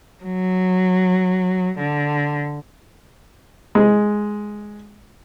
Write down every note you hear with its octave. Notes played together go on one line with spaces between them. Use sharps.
F#3
D3
G#3